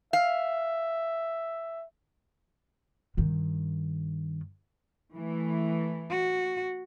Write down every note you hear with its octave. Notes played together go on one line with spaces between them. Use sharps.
E5 F5
G2 D#3
E3 A3
F#4